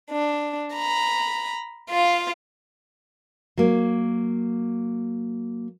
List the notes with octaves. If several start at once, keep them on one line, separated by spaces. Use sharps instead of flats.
D4
A#5 B5
F4 F5
F#3 A#3